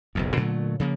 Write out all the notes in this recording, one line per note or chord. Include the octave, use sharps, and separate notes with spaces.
F#1 B1 F2
A#2 D3 F#3 A3
C#3 F3 A#3